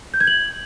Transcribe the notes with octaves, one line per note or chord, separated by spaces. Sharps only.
G6
G#6
F#7